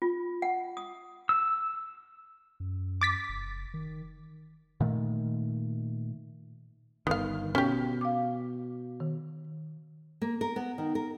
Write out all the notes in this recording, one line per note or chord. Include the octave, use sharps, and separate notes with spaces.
F4
F#5
D#6
E6
F#2
D6 A6 B6
F1
D#3
A#2 D#3 A3
G1 D#3 B3 F5
B2 C#4 G4
F5 D6
D#3
A#3
A#4
B3
D#3
A#4